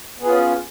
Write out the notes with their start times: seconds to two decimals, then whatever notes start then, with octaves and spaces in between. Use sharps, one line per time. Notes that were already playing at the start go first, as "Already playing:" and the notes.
0.19 B3
0.23 G#4
0.26 F4
0.29 C#4